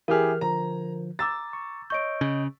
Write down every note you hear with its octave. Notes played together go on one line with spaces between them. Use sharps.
E3 E4 G4 G#4 A#4 F6
D3 F3 A#5
A#5 D6 E6 A6
C#6
C#5 D#5 C#6 G6 D7
C#3